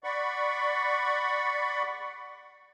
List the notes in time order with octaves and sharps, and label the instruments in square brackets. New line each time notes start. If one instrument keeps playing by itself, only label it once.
[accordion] D5 F#5 B5 C#6